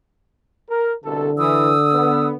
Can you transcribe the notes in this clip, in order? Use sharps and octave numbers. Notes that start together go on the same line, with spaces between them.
A#4
C2 B2 D3 A4
E3 D#6 E6
B3